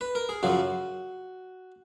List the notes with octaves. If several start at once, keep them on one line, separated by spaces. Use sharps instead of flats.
B4
A#4
G#4
F#2 C#3 F3 F#4